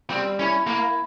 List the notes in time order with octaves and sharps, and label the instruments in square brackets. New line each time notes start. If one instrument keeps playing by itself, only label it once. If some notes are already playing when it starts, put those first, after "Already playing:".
[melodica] G3 [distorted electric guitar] C4
[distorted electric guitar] C#4 [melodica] E4
[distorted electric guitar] A#3 [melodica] E4